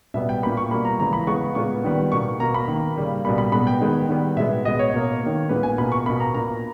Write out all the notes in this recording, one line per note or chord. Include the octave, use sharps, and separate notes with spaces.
B2 G3 B3 E5
G5
A#2 A#3 B5
C#6
B2 G3 A#3 B5
A#5
C#3 E3 G#3 A#5
B5
C#3 G#3 B3 C#6
A#2 G#3 B3 C#6
D#3 G3 B3
B2 A#3 C#6
B2 A#3 A#5
B5
D#3 A#3
C#3 G3 A#3
B2 G3 A#3 B5
B5
B2 G#3 B3 B5
G5
D#3 G#3 B3
D#3 G3 B3
B2 G#3 B3 E5
B2 G#3 B3 D#5
C#5
B2 A#3
A#3
D#3
A#2 G#3 B3 B4
G#5
B2 A#3 B5
C#6
B2 A#3 B5
A#5
A#2 A#3 A#5